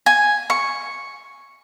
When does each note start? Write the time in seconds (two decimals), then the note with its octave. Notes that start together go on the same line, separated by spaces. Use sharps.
0.06 G#5
0.50 C#6